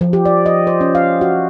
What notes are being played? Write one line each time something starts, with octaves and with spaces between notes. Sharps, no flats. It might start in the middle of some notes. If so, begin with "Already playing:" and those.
F3
G4
D5
D#5
C5
C#4
F5
F#4